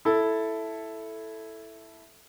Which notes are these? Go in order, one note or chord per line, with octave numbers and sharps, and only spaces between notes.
E4 A4